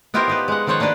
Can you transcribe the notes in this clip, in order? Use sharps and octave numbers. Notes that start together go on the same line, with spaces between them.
B3 E4 F4 G4 A#4 C5
D#4 G4 B4
G#3 F#5
D#3 F3 A4 C5 C#5 F#5
A#3 D4 G4 B4 C5